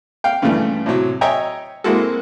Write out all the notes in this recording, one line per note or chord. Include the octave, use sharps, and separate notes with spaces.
F5 G5
G2 C#3 E3 F3 A3
A2 C3 F#3
C#5 D#5 E5 G5 G#5 A#5
G#3 A#3 C4 E4 F#4 A4